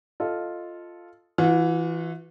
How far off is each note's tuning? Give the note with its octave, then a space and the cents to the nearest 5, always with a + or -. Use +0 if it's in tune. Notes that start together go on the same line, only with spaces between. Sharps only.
F4 +0 A4 +0 D#5 +0
E3 +5 F#4 -45